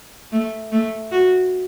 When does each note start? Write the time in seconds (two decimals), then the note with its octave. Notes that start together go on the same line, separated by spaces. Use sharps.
0.32 A3
0.72 A3
1.12 F#4